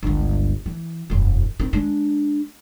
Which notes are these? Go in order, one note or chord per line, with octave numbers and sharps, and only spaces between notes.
G1 C#2
E3
E1 F#2
D#3 C4
G#3 D4